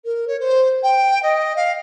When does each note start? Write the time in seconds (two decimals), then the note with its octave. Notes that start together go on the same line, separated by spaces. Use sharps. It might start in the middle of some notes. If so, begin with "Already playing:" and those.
0.05 A#4
0.28 C#5
0.40 C5
0.83 G5
1.23 D#5
1.56 F5